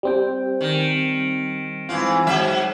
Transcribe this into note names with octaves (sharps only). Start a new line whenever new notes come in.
G3 C4 G5
D#3
G#2 E3 F4
G#2 F#3 E5